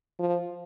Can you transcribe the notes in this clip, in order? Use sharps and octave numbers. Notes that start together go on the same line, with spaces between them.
F3